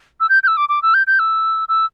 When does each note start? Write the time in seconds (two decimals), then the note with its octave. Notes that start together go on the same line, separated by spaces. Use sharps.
0.20 E6
0.29 G6
0.43 G6
0.48 E6
0.57 D6
0.69 D6
0.82 E6
0.94 G6
1.07 G6
1.19 E6
1.69 E6